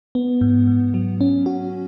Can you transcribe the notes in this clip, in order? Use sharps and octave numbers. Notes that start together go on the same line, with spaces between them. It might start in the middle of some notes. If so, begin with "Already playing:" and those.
B3
G#2
G#2
F#3
C#4
F#4